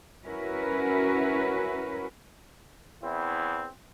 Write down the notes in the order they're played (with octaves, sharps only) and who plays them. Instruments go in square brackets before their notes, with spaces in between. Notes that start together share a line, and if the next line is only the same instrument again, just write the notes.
[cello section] C#4 E4 F#4 A#4 B4
[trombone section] E2 C4 E4